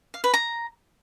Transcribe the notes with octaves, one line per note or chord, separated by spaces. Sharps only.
F5
B4
A#5